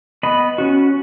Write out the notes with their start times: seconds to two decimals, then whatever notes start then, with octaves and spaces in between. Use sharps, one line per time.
0.23 B3 D#5 B5
0.58 C#4 F#4